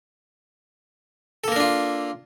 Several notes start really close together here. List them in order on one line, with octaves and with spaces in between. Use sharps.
A4 A#3 A#4 D4 F4